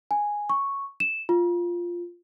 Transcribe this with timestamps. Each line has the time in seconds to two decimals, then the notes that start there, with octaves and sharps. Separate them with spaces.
0.11 G#5
0.50 C#6
1.00 E7
1.29 F4